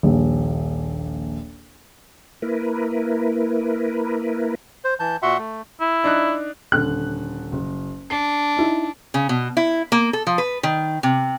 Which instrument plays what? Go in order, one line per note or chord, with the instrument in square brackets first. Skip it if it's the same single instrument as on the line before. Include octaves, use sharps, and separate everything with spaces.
[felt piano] D#1 A#1
[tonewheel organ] A#3 E4 A#4 B4
[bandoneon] C5
E3 A5 G6
A#2 F#4 E5 F#5 C6
A3
[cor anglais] E4
[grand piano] D4 D#4 F#6
D#1 D3 F#6
F#1
[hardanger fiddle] D4 [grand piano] C7
[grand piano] D#4 E4
[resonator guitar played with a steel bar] C#3
B2
E4
A#3
A4
F3
B4
D#3
C3